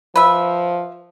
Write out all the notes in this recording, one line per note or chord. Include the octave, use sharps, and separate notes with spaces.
F3 B4 E5